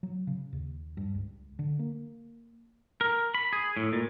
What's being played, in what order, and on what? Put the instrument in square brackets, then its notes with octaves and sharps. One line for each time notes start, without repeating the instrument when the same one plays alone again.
[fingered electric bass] F#3
C#3
D#2
G2
C#2
D3
A#3
[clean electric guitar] A#4
B5
G#4
A2
A#2